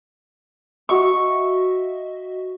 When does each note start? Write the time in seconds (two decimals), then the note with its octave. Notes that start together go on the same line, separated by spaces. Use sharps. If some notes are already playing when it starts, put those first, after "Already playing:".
0.89 F#4 D#5 E5 C#6